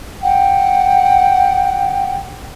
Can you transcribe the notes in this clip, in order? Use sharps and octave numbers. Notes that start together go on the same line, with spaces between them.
F#5 G5